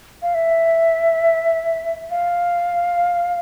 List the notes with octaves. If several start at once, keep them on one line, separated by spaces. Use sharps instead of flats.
F5
E5
F5